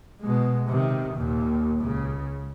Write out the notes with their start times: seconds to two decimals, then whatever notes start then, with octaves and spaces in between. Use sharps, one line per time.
0.21 B2 G#3
0.69 C3 D#3
1.14 D#2 A#2
1.80 C#2 C#3